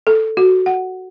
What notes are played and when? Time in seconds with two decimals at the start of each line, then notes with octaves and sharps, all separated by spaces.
0.07 A4
0.37 F#4
0.66 F#5